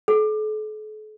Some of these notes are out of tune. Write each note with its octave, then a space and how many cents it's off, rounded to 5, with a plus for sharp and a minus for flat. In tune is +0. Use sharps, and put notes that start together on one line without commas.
A4 -45